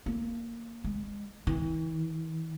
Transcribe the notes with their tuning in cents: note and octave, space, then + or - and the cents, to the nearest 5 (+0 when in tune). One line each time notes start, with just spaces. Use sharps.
A#3 -5
G#3 -25
E3 -40